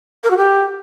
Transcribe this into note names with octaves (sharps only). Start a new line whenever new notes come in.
A#4
F#4
G4